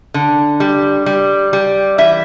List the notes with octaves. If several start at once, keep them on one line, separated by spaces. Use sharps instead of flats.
D3
G3
G3
G3
E3 E5